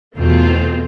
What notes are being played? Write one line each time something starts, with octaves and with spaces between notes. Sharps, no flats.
E2 B2 A3 C4 F4